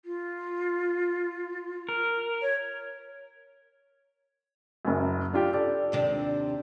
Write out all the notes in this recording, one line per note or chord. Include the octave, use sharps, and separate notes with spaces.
F4
A#4
C#5
F#1 F#2
D4 F4 G4
A4 D5
D#2 C3 D4